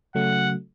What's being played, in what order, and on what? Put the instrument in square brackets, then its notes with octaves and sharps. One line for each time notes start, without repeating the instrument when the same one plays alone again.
[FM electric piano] C#3 F#3 A3 [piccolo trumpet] F#5